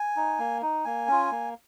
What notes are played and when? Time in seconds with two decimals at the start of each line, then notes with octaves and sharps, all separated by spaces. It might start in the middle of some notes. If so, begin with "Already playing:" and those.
Already playing: G#5
0.16 D#4
0.39 A#3
0.62 D#4
0.85 A#3 G#5
1.08 C#4 F4
1.31 A#3